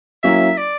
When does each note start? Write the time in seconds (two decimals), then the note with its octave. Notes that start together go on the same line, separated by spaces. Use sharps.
0.23 F#3 A#3 C#4 E4 E5
0.57 D5